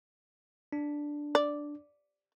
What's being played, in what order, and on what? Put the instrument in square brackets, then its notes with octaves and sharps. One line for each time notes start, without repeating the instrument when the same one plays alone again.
[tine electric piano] D4
[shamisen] D5